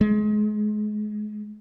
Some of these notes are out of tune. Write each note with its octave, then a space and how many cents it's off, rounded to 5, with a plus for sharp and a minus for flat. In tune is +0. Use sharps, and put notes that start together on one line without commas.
G#3 +30